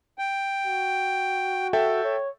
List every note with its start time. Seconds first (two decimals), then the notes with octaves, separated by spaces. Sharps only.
0.18 G5
0.66 F#4
1.73 A4 E5 G5
2.04 C#5